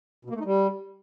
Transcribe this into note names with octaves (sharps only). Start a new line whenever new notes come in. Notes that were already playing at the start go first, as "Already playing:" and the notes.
B2
A#3
A3
D#4
G3